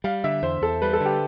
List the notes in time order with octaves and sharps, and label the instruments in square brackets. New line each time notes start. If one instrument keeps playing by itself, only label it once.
[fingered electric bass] G3 [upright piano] F5
[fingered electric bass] D3 [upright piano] E5
[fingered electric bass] E2 [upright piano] C5
[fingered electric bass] E2 [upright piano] A4
[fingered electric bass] G3 [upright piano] B4
[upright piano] A4
[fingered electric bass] D3
[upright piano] G4